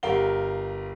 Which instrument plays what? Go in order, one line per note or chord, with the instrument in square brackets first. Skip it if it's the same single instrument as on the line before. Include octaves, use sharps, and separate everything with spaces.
[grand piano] G1 G4 A#4 F5 G7